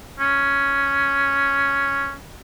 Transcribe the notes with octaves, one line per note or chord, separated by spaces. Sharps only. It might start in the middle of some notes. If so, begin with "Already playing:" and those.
C#4